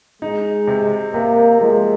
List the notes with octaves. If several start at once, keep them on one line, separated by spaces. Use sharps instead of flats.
G#3 D#4
C3
C3 A#3
F3 G#3